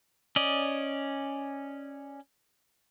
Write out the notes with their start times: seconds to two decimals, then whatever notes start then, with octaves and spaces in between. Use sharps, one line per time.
0.36 C#4 D5 D#5